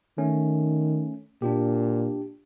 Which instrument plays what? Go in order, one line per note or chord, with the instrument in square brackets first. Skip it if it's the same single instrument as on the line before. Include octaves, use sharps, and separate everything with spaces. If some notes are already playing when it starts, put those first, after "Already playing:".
[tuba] D#3 [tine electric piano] A3 C#4
[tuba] A#2 [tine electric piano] D4 F4 G4